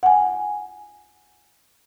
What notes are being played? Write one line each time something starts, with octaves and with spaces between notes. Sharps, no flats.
F#5 G#5